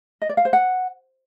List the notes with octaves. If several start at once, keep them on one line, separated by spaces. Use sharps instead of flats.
D#5
D5
F5
C5
F#5